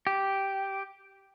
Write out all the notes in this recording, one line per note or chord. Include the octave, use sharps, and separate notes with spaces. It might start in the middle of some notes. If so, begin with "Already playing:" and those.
G4